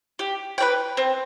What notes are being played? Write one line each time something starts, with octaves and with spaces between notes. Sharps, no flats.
G4
B4 D5 G5
C4